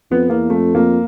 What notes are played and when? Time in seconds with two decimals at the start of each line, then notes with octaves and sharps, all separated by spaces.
0.11 F2 B3
0.30 E2 A#3
0.49 F2 A3
0.75 F2 A#3